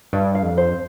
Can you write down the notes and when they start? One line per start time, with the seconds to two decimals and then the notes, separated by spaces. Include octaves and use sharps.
0.13 G2 D5
0.35 F5
0.43 F2
0.58 C5